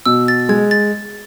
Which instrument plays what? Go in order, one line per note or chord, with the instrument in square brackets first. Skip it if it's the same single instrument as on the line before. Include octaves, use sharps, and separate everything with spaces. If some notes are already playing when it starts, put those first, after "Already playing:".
[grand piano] B2 [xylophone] E6
[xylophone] A6
[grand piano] G#3 [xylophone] G#6
[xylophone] A6